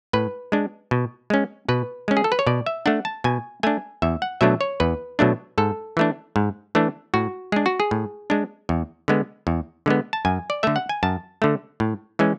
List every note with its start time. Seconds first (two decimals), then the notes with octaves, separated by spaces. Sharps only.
0.13 A2 B4
0.52 G#3 D4
0.91 B2
1.30 G#3 C#4
1.69 B2 B4
2.08 G#3 C#4
2.17 G#4
2.24 A4
2.32 B4
2.39 C#5
2.47 B2 D5
2.66 E5
2.86 A3 D4 F#5
3.05 A5
3.24 B2 G#5
3.63 A3 D4 G#5
4.02 E2 E5
4.22 F#5
4.41 B2 F#3 A3 D4 E5
4.61 C#5
4.80 E2 B4
5.19 B2 F#3 A3 D4
5.58 G#2 A4
5.97 E3 A3 D4
6.36 G#2
6.75 E3 A3 D4
7.14 A2 F#4
7.52 G#3 D4 G#4
7.66 F#4
7.80 G#4
7.91 A2
8.30 G#3 D4
8.69 E2
9.08 D3 G#3 B3
9.47 E2
9.86 D3 G#3 B3
10.13 A5
10.25 F#2 G#5
10.50 D5
10.63 D3 A3 E5
10.76 F#5
10.89 G#5
11.03 F#2 A5
11.42 D3 A3
11.80 A2
12.19 E3 G#3 C#4